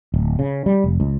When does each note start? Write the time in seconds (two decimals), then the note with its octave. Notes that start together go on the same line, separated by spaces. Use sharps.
0.14 D1
0.39 C#3
0.66 G3
0.84 F1
1.00 C#2